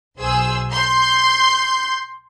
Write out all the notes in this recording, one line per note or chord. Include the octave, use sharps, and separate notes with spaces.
B1 G#4 C5 E6
C6 G6